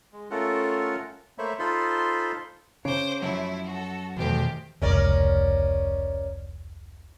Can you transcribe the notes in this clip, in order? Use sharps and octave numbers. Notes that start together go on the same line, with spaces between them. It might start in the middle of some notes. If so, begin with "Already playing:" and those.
G#3
A3 C#4 F4 A4 A#4 F#5
A3 A#3 C5 C#5 E5 B5
D#4 F4 A4 C5 B5 C6
C#3 C5 C#5 D6
F#2 F3 A3 E4
F#4 A4
E2 B2 D#3 A3 G4 C5
F1 C#2 C#4 A#4 D5